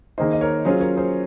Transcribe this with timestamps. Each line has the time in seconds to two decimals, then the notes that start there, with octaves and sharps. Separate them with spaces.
0.18 D#3 A#3 D#4 G#4 C5
0.33 D#5
0.41 A#4 C#5
0.65 F#3 C#4 F4 G#4 C5
0.81 A#4 C#5
0.96 G#4 C5